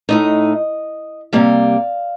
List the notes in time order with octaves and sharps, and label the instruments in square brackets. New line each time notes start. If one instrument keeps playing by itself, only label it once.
[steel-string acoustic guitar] A2 A3 D#4 D#5
C3 G3 A#3 F5